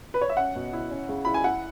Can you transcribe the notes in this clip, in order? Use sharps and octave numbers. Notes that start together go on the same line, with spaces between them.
B4
C#5
E5
C#4 F#5
B2
E4
C#4
C#3
E4 B5
G#5
E4 F#5